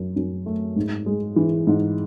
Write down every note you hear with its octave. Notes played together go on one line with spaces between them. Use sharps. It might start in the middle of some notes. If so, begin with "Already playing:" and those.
Already playing: F#2
F#2
A3
G#2
G#3
E3
G#2